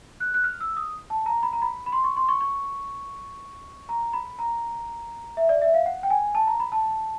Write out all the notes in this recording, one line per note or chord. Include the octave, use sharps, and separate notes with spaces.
F#6
F#6
F6
E6
D#6
A5
A#5
B5
A#5
B5
B5
C6
C#6
C6
C#6
C#6
A#5
B5
A#5
E5
D5
E5
F5
F#5
G5
G#5
A5
A#5
B5
A5